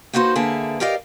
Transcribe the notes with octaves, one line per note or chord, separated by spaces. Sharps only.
A#3 D#4 F#4 B4 C5
D3 A#3 G#4 B4 E5 A5
G4 A#4 D5 D#5 F5